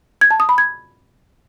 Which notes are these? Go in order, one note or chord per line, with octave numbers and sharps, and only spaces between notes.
G#6
A5
D#6
B5
G#6